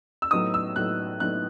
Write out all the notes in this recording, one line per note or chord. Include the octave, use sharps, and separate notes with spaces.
E6
A2 F#3 B3 D#4 D#6
E6
A2 F#3 B3 D#4 F#6
A2 F#3 B3 D#4 F#6